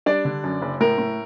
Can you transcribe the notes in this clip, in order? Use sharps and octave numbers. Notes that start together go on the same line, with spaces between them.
G3 D4 D5
D3
F#2
F#1
A2 A#4
A2